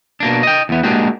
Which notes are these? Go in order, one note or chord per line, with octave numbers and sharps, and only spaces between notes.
B2 A#3 D4
D#5 G5
E2 B3
G#3 A#3 D4 D#4 F#4 G4